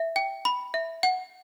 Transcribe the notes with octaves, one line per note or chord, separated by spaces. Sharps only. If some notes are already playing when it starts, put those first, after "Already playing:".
Already playing: E5
G5
B5
E5
F#5